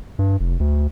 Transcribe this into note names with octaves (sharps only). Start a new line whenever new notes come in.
G2
F1
D2